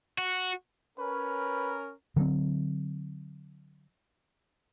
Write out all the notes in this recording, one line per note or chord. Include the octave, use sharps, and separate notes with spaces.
F#4
C#4 A#4 B4
D3 F#3 B3 C4